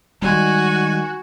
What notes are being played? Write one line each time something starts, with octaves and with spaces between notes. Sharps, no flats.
D#3 G3 G#3 F#4 G#5